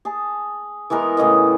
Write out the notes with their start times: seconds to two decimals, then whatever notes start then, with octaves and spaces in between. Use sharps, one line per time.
0.05 G#4 A5
0.90 E3 G#3 B3 A#4
1.17 A2 C#3 E3 D#5